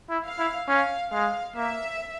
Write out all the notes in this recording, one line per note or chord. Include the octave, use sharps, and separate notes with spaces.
E4
F5
E4
C#4 F5
G#3 F5
A#3 E5